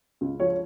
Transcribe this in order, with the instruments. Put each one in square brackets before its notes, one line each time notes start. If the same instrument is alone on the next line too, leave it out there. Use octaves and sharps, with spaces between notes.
[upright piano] C#2
F3 C#5